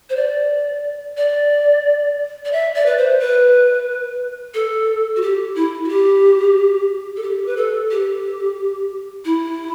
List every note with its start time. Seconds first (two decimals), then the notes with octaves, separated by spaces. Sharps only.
0.10 C5
0.17 D5
1.17 D5
2.45 D5
2.52 E5
2.75 D5
2.86 B4
2.97 C5
3.20 B4
4.54 A4
5.16 F#4
5.22 G4
5.55 E4
5.84 F#4
5.89 G4
7.17 A4
7.23 G4
7.46 B4
7.56 A4
7.91 G4
9.25 E4